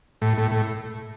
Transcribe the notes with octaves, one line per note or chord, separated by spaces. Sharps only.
A2
A2
A2